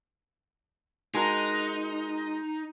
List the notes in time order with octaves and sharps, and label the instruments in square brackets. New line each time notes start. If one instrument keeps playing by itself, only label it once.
[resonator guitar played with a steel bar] G#3 F#4 A#4 [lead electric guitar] D#4